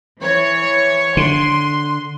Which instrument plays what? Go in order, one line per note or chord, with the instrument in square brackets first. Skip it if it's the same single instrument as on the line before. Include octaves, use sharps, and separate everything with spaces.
[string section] E3 C#5
[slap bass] D3 [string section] C6